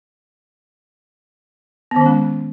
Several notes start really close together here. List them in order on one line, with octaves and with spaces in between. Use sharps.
B3 D#3 C#4 G#3